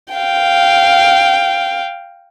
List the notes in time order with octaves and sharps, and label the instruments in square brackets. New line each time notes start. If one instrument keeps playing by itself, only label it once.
[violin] F5 G5